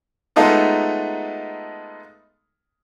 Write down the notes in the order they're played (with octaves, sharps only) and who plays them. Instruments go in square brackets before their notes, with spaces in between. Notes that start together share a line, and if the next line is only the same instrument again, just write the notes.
[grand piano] G#3 A3 B3 D#4 F4 A4